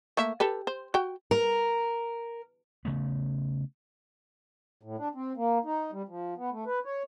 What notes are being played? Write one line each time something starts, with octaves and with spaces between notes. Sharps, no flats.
A3 A#3 E5
G4 A4 B4
C5
F#4 G5
A#4
C#3 A3 B3
A2
D4
C4
A#3
D#4
G3
F3
B3
A3
B4
C#5